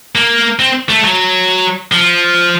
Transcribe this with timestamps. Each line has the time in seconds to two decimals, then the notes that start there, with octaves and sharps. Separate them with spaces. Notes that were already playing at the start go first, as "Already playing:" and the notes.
0.15 A#3
0.59 C4
0.89 A3
1.04 F#3
1.92 F3